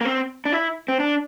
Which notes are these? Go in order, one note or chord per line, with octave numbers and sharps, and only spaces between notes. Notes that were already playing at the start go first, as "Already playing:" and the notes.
A#3
C4
D4
E4
C4
D4